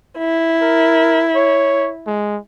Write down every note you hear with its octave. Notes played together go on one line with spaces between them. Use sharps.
E4
A#4
C#5
G#3